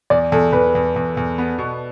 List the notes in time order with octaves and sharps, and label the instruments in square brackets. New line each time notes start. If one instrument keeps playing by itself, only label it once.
[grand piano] E2 [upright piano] D5
[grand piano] E2 [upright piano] A4
[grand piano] E2 [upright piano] B4
[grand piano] E2
E2
E2
B3
B2